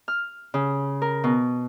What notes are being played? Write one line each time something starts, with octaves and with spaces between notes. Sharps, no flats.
F6
C#3
A#4
B2